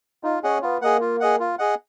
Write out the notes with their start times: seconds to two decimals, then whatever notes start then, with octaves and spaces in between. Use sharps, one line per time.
0.23 D#4 F4
0.43 C#4 G#4 D#5 F#5
0.62 B3 F4
0.82 A#3 G#4 D#5 F#5
1.01 F4
1.20 G#4 D#5 F#5
1.40 F4
1.59 G#4 D#5 F#5